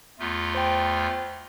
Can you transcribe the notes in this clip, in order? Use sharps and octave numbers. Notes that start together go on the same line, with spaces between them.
E2 A3 F4
C5 G5